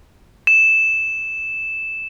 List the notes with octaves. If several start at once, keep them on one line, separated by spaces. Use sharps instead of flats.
E7